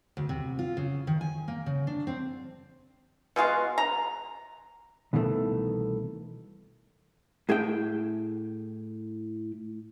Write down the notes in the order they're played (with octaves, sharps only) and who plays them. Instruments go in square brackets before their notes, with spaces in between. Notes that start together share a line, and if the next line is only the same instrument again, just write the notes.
[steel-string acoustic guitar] D2
C3
F4
C#3
D#3
G#5
A#3
C#3
D4
C4
[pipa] B2 G#3 F4 F#4
A#5
[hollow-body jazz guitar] C2 B2 D#3 E3 G3 A3
A2 G#4 E5 G5